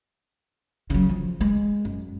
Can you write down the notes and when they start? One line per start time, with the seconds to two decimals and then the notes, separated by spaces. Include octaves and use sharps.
0.90 C#3 F#3
1.09 F3
1.41 G#3
1.85 F#2